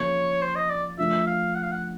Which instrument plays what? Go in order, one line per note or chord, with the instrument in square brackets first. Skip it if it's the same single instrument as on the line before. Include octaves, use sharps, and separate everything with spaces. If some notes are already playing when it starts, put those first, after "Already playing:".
Already playing: [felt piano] C#3 F3 A#3 [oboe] C#5
[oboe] C5
D#5
D5
[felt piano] F3 A3 D4 F4 [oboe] E5
[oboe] F5
F#5
F5
F#5